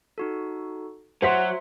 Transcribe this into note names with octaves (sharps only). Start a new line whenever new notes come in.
D#4 F#4 A4
F#3 F#4 C5 E5 C6 B6